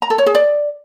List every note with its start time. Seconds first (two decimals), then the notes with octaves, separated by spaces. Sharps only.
0.02 A#5
0.10 A4
0.18 C#5
0.26 G#4
0.35 D5